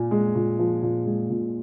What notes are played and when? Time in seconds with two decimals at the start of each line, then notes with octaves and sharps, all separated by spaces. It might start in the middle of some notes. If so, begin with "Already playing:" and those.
Already playing: A#2 G#5
0.11 G#3
0.35 A#2
0.59 F3
0.82 A#2
1.06 G#3
1.30 A#2